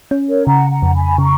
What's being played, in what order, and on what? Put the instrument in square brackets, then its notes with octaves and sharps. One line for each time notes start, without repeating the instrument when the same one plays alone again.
[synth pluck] C#4
[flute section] A#4 C#5
[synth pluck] C#3 [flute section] F#5 A#5
[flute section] F#5 A#5
[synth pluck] F2
[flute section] G#5 B5
[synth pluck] C#3 [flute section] A#5 C#6